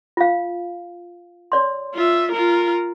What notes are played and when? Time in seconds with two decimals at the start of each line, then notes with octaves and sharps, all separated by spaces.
0.17 F4 F5
1.52 C#5 D5 C6
1.94 F4 E5
2.32 F4 A#4